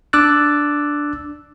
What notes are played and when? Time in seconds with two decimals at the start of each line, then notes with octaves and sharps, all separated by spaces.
0.13 D4 D6 E6 F#6 A6